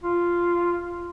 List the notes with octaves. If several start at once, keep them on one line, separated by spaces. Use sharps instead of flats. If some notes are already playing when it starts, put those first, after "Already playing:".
F4